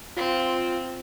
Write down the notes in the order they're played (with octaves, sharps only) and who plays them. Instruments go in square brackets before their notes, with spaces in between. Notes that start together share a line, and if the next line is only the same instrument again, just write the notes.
[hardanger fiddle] C4 [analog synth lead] F4